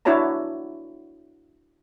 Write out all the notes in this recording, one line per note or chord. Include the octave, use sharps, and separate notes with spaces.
D4 E4 F#4 C#5 A5 A#5